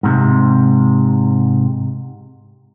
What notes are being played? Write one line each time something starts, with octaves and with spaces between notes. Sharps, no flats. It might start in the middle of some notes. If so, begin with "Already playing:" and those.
G#2 C3